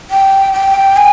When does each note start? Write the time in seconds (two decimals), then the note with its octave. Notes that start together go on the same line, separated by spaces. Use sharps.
0.10 G5
0.54 G5
0.96 G#5